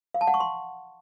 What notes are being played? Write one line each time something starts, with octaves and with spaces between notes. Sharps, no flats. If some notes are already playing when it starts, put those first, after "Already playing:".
F5
A5
F#5
C#6
C6